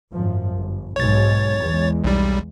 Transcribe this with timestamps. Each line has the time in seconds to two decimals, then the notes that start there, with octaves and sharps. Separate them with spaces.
0.13 G#1 F#2 F3
0.56 G1
0.96 B1 G#2 B2 C#5 A6
1.60 E2 G#3
2.04 B1 G3